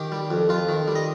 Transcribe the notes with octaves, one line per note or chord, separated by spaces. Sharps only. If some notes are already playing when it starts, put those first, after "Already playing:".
Already playing: D#3 G4
G3
F2
F2 F4
D#3
G3
D#5